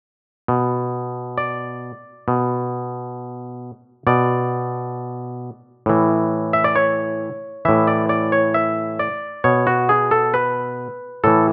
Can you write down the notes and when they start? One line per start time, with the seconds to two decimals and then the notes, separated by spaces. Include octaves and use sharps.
0.48 B2
1.38 D5
2.28 B2
4.07 B2 D5
5.86 A2 E3
6.53 E5
6.64 D5
6.76 C#5
7.65 A2 E3 E5
7.88 D5
8.09 D5
8.32 C#5
8.54 E5
8.99 D5
9.44 B2 C#5
9.67 F#4
9.89 G#4
10.11 A4
10.34 B4
11.24 A2 E3 A4